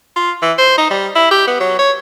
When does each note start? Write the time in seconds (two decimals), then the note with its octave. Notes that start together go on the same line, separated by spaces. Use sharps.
0.16 F4
0.42 E3
0.58 C5
0.78 D#4
0.90 G3
1.15 E4
1.31 G4
1.47 B3
1.60 F#3
1.79 C#5